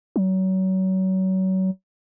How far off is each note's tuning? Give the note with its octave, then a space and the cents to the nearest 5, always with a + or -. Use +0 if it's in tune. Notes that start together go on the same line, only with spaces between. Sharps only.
F#3 +30